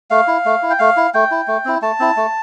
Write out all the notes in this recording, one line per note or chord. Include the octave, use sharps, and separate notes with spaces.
A3 F5
E4
A3
E4
G5
A3 F5
E4
A3 G5
E4
A3
C4 E4
A3 A5
C4 E4
A3